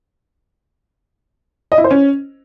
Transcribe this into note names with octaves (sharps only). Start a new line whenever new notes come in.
D#5
E4
C5
C#4